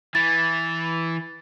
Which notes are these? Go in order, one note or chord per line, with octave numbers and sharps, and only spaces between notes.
E3 A6